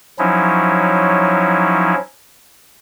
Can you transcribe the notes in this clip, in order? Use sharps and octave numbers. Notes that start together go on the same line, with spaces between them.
F3 F#3 C#4 D#4 E4